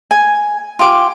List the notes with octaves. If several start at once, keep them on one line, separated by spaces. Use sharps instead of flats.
G#5
F4 G4 D6